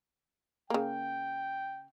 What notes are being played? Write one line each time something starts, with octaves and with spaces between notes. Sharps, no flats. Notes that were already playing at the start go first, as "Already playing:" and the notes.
C#3 A#3 G5